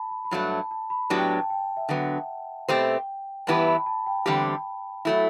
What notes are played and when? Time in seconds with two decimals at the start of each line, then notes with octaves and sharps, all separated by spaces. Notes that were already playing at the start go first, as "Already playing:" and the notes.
Already playing: A5 B5
0.11 B5
0.25 B5
0.31 G2 F#3 A3 A5
0.50 A5
0.71 A5
0.90 B5
1.09 A2 F#3 B3 D4 G4 A5
1.18 G5
1.25 A5
1.40 A5
1.50 G5
1.77 E5
1.89 D3 F#3 B3 F#5
2.68 B2 A3 C4 G4 C5 G5
3.47 G2 E3 B3 E4 G4 A5
3.67 B5
3.86 A5
4.06 G5
4.26 E2 D3 G3 C4 G4
5.05 F#3 A3 E4